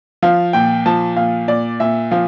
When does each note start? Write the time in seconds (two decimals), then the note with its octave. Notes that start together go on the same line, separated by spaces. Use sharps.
0.22 F3 F5
0.53 A#2 G5
0.86 F3 A5
1.16 A#2 F5
1.48 A#2 D5
1.80 A#2 E5
2.11 F3 F5